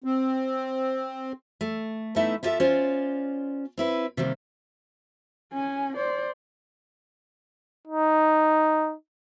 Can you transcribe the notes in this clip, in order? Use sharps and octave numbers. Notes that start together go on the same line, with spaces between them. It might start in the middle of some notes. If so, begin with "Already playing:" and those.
C4
A3
A3 B3 D#4 E4 E5
E4 F4 G4 A4 E5
C#4 F4 C5 D5
C4 E4 B4
C3 D#3 G3 A#3
C#4 G#5
C5 D5
D#4